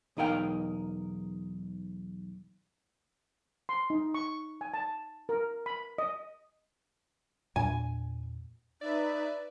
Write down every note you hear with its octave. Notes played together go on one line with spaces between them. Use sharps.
B1 E2 D#4 A#4 F5 G5
C6
D#4
C#6
G#5
A5
A#4
B5
D#5
E2 A#2 D4 G#5
D#4 B4 D5 E5